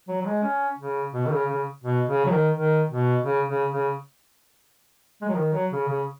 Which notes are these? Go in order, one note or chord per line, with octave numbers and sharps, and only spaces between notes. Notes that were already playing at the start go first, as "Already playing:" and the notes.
F#3
F#3
G#3
C#4
C#3
B2
D#3
C#3
C#3
B2
C#3
F#3
D#3
D#3
B2
C#3
C#3
C#3
G#3
F#3
D#3
F#3
C#3
C#3